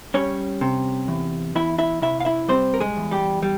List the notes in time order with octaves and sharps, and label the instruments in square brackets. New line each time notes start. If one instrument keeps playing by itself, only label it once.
[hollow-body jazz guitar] G3 C#4 C#5
C3
E2
E2 E4 E5
E4 E5
C3 E4 E5
F5
E4 E5
G3 C4 C5
A#4
G#3 G#4
E2
G3 G4
G3